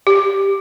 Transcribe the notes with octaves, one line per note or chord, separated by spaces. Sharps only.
G4